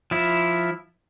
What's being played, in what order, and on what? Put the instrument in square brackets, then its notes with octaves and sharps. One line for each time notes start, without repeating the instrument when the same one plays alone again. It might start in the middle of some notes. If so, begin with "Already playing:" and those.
[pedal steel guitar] F3 E4